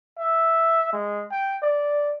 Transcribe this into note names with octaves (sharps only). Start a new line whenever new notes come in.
E5
G#3
G5
D5